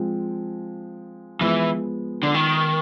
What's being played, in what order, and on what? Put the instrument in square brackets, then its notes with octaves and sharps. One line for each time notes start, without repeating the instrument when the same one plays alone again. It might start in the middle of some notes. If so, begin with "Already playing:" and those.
Already playing: [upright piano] F3 G#3 C4
[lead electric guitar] E3 [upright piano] F3 G#3 B3
[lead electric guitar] D3
D#3